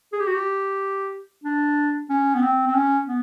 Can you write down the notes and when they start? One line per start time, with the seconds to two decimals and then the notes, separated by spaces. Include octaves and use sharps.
0.13 G#4
0.20 G4
0.27 F#4
0.34 G4
1.44 D4
2.10 C#4
2.35 B3
2.42 C4
2.67 C4
2.75 C#4
3.07 B3